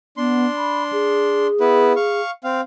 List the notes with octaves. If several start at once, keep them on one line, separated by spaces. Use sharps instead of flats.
B3 D4 C6
B5
G#4
B3 E4 B4
F5 C#6
C4 F5